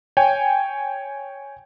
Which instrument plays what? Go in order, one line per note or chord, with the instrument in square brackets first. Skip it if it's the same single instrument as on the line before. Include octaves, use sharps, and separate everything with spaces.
[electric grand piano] C#5 G5 G#5